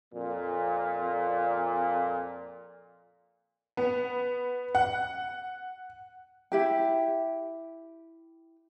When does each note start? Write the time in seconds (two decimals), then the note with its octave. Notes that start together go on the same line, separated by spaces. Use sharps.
0.13 F2 A#2
3.77 B3
4.75 F#5
6.52 E4 G4 G5